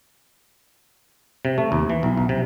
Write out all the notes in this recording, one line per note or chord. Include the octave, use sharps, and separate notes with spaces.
C3
A3
D#2
E3
B1
B1
C3